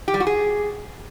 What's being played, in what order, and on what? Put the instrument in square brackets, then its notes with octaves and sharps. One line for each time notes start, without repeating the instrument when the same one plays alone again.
[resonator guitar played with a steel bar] G4
G3
F#4
G#4